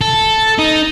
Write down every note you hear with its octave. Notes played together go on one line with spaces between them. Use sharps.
A4
D#4